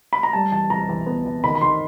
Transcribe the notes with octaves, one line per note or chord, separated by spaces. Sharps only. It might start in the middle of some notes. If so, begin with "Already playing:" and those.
B5
A#5
G3 A5
E3 A5
E3 A#5
E3
B3
E3
D#3 B5
B5
D#3 C6